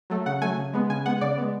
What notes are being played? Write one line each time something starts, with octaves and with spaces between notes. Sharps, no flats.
F#3 A3
C#3 F#5
F#3 A3 G#5
C#3
G#3 B3
C#3 G#5
G#3 B3 F#5
C#3 D5
G#3 B3